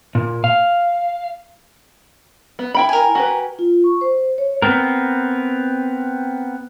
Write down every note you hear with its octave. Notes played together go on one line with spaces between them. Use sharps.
A#2
F5
B3
E4 G5 B5
A#4 G#5
F#4 G4 B4
F4
C#6
C5
C#5
B3 C4 A#4